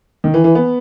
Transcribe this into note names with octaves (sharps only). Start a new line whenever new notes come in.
D#3
E3
E3
B3